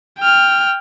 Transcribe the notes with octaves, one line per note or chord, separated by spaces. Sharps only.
G5 F6